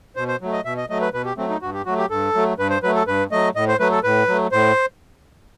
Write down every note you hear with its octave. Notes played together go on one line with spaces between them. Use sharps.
B2 C5
C5
F#3 A3
D#5
B2 E5
D#5
F#3 A3 D#5
B4
B2 B4
G4
F#3 A3 C4
D#4
G2 F#4
G4
F#3 A3 F#4
G4
G2 A4
F#3 A3
G2 B4
C5
F#3 A3 B4
A4
G2 B4
F#3 A3 D#5
A2 D#5
C5
F#3 A3 B4
A4
A2 B4
F#3 A3
A2 C5